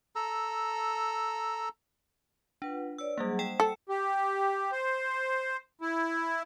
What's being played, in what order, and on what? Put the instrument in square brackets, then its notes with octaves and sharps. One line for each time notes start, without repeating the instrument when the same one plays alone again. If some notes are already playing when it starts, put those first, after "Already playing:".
[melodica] A4 A#5 E6
[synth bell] D4 [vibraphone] F4 B4 F#5
[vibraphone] B4 C#5 D5 [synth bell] E6
[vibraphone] F#3 G#4 F#5 [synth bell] G3 A#3
[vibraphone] C5 [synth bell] F#5 G5 E7
[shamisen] A4 [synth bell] C#7
[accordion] G4
C5
E4